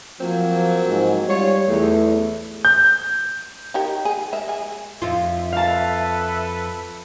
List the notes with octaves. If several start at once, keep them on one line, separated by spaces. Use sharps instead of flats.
F3 F#3 A#3 C4
G#2
G3 F4 C#5
E2 A3
G6
D#4 G4 A#4
G#4
G#3 A#4 E5
G#4
F2 F4 E5
A4 B4 F5 A5